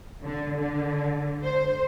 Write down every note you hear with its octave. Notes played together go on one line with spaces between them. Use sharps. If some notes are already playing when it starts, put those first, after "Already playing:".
D3
D3
C5